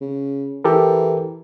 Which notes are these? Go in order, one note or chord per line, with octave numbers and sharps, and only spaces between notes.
C#3
E3 G4 A4 A#4